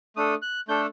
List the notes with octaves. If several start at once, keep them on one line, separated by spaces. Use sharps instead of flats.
A3 D4 A4 D#6
F#6
A3 D4 A4 G6